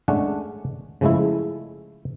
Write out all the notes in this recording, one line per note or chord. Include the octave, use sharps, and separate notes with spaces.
G#3 A3 C#4 D4 F#5
C#3 F3 G#3 A3 E4